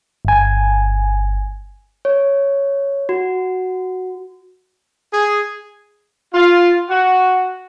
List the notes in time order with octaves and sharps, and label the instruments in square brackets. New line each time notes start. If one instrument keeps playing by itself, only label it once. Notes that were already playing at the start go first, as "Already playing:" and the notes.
[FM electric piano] G1 G#5
[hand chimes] C#5
F#4
[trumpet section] G#4
[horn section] F4
F#4